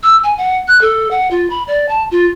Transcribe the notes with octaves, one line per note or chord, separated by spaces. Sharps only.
E6
G#5
F#5
F#6
A4
F#5
F4
B5
D5
A5
F4